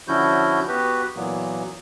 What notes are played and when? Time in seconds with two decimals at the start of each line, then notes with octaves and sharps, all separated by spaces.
0.08 D3 F3 C#4 E4 F#4 G6
0.68 B3 F#4 G4 B4
1.16 A#2 E3 F#3 A#3 B3